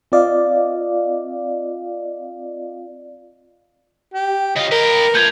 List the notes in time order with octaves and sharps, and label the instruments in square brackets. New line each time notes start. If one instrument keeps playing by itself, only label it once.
[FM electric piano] C4 F4 D5 D#5 F5
[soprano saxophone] G4
[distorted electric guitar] C#3 F4 [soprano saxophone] D#5
[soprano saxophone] A#4 [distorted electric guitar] B4 G5
[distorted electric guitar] A3 F4 [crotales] G6 G#6 F7